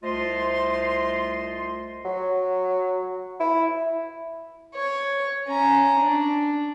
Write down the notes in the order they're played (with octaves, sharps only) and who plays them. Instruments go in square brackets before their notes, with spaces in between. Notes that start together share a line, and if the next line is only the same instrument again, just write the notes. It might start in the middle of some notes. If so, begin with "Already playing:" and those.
[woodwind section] C2 A3 F4 C5 D#5 C6
[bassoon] F#3
E4
[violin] C#5
C#4 A#5
D4